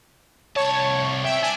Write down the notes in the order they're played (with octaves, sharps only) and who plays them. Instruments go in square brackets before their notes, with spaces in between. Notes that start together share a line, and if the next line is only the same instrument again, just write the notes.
[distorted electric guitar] C2 A5 [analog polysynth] C#5
[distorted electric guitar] C#2 G5 [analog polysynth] E5
[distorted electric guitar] D4 [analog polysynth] G#5